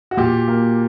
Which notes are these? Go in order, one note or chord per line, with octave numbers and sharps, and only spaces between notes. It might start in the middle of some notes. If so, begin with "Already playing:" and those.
F#4
A#2 G4
A#3